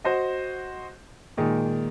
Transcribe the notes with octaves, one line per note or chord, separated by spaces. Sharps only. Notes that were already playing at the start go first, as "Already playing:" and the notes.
F#4 C5 D#5
A#2 D#3 G#3 G#4